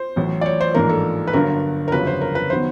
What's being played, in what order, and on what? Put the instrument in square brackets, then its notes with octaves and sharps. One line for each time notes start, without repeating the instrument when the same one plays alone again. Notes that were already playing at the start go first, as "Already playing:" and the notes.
Already playing: [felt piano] C5
A1 A2 F#3
D5
C#5
C5
A1 G#2 F3 A#3 D4 A#4
A4
B4
G1 G2 D3 F#3 A#4
A#4
G1 F2 C#3 F#3 B4
C5
A#4
B4
D#3 F#3 B3 C5